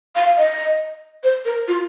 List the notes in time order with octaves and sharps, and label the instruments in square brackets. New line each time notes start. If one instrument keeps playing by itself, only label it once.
[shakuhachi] F5
D#5
C5
A#4
F4